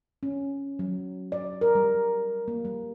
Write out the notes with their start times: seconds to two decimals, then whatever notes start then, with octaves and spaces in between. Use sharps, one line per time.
0.23 C#4
0.79 F#3
1.32 D5
1.61 A#4
1.75 G3
2.48 A#3
2.65 G3